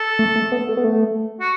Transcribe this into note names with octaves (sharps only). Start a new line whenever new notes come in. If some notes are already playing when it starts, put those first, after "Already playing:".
Already playing: A4
A3
A3
B3
A3
B3
A3
F#4